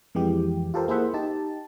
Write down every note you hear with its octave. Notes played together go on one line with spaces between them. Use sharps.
F2 E3 G#3 G4
F4 G4 A4 A#4 C5
A#3 E4 G#4 C5 E5 F#5
D#4 G4 A5